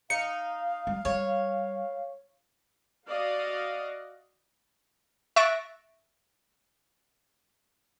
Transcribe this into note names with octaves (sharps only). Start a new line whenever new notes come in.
D#4 F5 C#7
G3
G3 C#5
F#4 D5 D#5 F5
E5 C#6 F#6 A6 A#6 D7